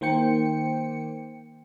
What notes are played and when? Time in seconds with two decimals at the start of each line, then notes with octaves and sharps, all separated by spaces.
0.01 D#3 A#3 C5 G5 C#7